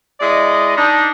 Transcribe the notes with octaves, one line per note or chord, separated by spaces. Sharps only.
G#3 E4 D5 D#5
D4 D#4